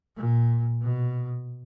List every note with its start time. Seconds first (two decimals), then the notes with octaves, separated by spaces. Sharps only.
0.16 A#2
0.81 B2